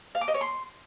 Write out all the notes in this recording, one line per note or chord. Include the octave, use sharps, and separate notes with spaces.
F5
D6
D#5
C#5
C6